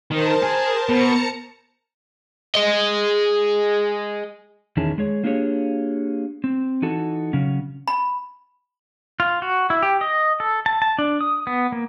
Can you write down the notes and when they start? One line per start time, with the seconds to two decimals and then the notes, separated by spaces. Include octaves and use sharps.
0.11 D#3 A#4 C5 A5
0.43 G#4
0.89 B2 A5 A#5 C#7
2.55 G#4 D#5
4.77 E2 D#3 E3 C#4 G#4 A5
4.98 G#3 G#4 C#5
5.24 A#3 D4 F4 G4 G#4 C#5
6.44 C4
6.82 E3 D#4 F#4 A4
7.33 C#3 F#3 C#4
7.88 B5
9.20 F4
9.42 F#4
9.70 E4
9.82 G4
10.01 D#5
10.40 A4
10.66 A5
10.82 A5
10.99 D4
11.21 D#6
11.47 B3
11.72 A#3